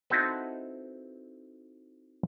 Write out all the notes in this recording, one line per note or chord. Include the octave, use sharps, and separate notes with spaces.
C4 D#4 E4 F#4 A4 B4